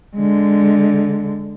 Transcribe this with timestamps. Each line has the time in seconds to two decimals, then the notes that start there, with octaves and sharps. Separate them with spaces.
0.16 D3 G#3